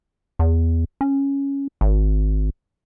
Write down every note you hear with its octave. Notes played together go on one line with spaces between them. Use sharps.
E2
C#4
G#1